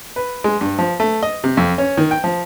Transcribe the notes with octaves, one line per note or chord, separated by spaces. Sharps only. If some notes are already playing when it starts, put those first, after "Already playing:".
B4
G#3
G2
F3
A3
D#5
C3
F2
C#4
D#3
G5
F3